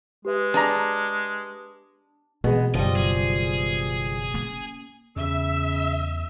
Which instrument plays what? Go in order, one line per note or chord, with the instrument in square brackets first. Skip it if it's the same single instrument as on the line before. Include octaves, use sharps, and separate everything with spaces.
[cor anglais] G#3 [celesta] G4 B4 E5
[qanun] D4 [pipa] G#4 D5 A#5
[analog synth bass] B2 [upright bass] E3 C4 [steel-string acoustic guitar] G#3 B3
[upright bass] F#1 D#3 [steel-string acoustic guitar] F3 G3 [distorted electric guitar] D#5
[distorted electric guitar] G#4
[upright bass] A#3 C#4
[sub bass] E2 [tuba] C#3 [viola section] E5